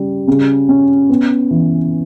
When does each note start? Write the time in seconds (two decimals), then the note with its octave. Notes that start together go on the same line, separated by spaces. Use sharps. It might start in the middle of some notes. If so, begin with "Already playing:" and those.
Already playing: C#3 G3
0.28 C#3
0.69 C#4
1.09 B3
1.51 E3